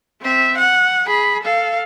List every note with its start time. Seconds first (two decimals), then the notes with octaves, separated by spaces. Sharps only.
0.22 C4 E5
0.58 F#5
1.07 G#4 B5
1.43 A4 F5